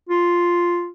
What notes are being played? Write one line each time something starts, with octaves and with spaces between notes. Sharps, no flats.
F4